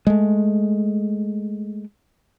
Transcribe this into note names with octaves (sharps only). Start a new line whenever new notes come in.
G#3 A3